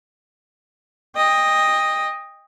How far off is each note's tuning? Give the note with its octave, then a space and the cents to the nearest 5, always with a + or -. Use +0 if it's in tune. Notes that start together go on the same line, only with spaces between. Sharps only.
D#5 +0 G5 +30